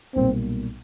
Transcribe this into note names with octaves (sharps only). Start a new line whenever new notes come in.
B1 A#2 G3 C4